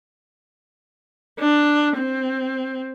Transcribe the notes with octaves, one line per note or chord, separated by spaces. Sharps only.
D4
C4